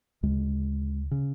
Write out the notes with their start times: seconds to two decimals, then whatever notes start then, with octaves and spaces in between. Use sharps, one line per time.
0.23 D2 C#3 G#3
1.11 C#3